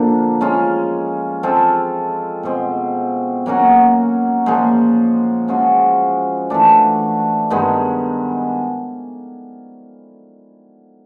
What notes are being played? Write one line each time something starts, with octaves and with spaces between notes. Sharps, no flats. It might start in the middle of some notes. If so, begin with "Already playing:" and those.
Already playing: D3 F3 A#3 D4
G#3 C#4 F4
G#3 C4 F4 A4
B2 G#3 C4
F#3 A#3 C#4 F#4
A#2 F3 G#3
F3 G#3 C#4 F#4
E3 A3 D4
G2 D#3 G#3 B3